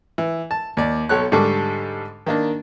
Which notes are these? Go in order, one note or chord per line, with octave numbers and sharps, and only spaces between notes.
E3
A5
D#2 D5
B1 A4 C#5 F#6
G#2 D3 G3 A4 C#6 D6
D#3 A#3 D4